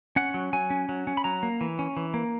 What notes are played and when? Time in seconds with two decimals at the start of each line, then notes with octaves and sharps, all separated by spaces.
0.16 C#4 F#5
0.34 F#3
0.53 F#3 G#5
0.70 C#4
0.89 F#3
1.07 C#4
1.17 B5
1.24 F#3 A#5
1.43 A#3
1.61 E3
1.79 C#4
1.97 E3
2.14 A#3